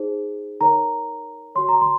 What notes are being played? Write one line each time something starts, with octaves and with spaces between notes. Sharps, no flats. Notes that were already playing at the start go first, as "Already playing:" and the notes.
Already playing: D#4 G#4 C5
D#4 A#4 C#5 A#5
F#4 C#5 C6
A#5
C6